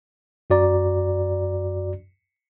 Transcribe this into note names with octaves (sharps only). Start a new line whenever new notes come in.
F#2 F#4 D5 A#5